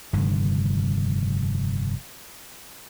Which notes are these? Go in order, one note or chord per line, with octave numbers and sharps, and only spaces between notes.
F1 G2 D3 D#3